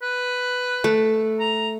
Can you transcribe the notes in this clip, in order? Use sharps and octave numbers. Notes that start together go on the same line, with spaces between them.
B4
A3
A#5